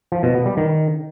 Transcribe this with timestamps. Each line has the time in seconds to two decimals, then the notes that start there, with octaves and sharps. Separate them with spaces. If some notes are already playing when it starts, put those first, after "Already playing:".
0.12 F3
0.23 B2
0.35 B3
0.46 G3
0.57 D#3